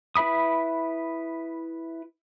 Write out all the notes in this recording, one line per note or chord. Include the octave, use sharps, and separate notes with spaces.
E4 B4 E5 B5 D#6